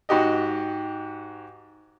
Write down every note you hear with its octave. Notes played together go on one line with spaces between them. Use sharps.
G#2 F#4 G4 D#5